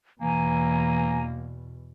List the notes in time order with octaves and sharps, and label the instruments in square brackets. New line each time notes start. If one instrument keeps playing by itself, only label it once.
[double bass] E2 B2 [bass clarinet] E3 [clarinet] A#3 [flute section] G#5 A#5